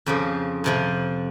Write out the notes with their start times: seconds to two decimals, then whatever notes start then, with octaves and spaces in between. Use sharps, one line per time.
0.06 F2 C#3 F3 G4
0.64 F2 C3 F3